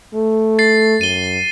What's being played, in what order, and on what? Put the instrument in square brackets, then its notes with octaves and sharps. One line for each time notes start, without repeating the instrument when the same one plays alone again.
[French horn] A3
[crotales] A6 C7
[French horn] F#2 [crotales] D#7 G7